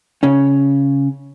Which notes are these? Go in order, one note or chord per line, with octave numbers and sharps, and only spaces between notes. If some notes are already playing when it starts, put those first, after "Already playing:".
C#3 C#4